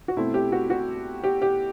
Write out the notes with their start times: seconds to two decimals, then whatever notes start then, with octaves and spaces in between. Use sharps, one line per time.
0.08 F#4
0.17 B2 A3 C4 E4
0.34 G4
0.52 F#4
0.70 F#4
1.24 G4
1.42 G4